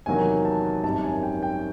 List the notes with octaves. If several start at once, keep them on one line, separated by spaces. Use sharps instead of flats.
E2 C3 D#3 F#3 A#3 G#5
A5
G#1 F#2 D#3 G3 A5
G#5
G5
G5